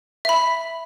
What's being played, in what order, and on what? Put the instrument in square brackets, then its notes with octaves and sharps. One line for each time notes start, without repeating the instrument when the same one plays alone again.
[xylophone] E5 B5